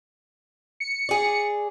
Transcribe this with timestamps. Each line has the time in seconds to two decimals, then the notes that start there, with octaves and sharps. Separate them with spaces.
0.80 C#7
1.09 G#4 D5